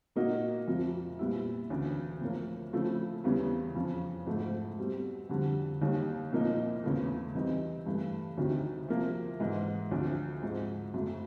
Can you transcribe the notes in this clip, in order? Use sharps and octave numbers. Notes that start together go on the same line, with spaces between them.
A#2 F#3 A#3 D#4 F#4
F2 C3 F3
A#2 G3 B3 E4
D2 C#3 E3
A2 F3 A#3
C#3 F3 A3 C4 E4
E2 C#3 E3 G3 B3
F2 C#3 F3
G#2 F3 A3
B2 G3 C4
F2 D3 G3
D#2 D#3 G3
C2 A#2 F3 A#3 D#4
E2 C#3 E3 A3 C4
C3 E3 G3 C4 D#4
G2 E3 A3
D2 C3 D#3 F#3
C3 F3 A#3
G#2 E3 G#3
D2 C3 F3
G#2 F3 G#3 C4
F#2 C#3 F#3 A3